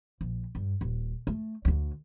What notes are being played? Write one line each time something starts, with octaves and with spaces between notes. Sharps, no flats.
A#1
G2
D#1
A3
D2 D3